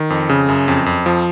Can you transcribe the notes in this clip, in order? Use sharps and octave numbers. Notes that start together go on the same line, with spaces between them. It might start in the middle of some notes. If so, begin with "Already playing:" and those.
Already playing: D#3
F2
C#3
F#2
F2
F2
F3